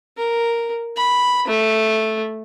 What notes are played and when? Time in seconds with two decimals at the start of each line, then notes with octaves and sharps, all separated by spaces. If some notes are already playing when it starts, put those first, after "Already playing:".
0.17 A#4
0.96 B5
1.48 A3